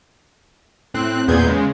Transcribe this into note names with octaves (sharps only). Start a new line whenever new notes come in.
A2 C4 F#6
E2 A#2 B3 G#4 G6 G#6
C#3 G#3